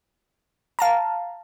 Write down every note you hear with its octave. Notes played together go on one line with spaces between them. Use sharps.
F5 A5 A#5